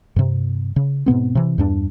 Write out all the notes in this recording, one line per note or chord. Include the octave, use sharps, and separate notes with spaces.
G2 C3
C#3
G#2 B2 B3 C4
C3 E3
E2 G2 D4